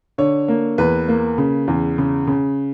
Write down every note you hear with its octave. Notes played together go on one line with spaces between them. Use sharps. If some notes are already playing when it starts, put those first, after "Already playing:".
D3 C#5
A#3
E2 B4
A#3
C#3
E2
C#3
C#3